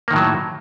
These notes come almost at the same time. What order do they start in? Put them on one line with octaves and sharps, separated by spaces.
A#3 D#3 A2 F#3